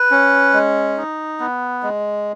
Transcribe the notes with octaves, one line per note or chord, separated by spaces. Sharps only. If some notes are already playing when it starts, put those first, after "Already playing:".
Already playing: B4
C#4
G#3
D#4
B3
G#3